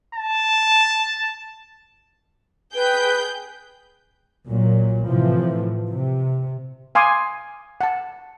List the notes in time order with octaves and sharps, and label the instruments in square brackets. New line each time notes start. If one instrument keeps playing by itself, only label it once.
[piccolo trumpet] A5
[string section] G#4 G5 G6 [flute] B4
[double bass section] A#1 A#2 F#3
A2 C3 E3 F3
C3
[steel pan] F5 G#5 C6 D6 D#6
F#5 A5